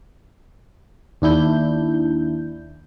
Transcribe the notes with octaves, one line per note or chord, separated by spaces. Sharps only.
D#2 D4 E4 G6